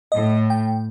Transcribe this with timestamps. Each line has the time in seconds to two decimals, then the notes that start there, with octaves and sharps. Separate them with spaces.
0.12 A2 D#5
0.50 G5